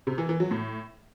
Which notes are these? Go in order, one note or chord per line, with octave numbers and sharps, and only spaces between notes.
C3
E3
E3
F#3
A2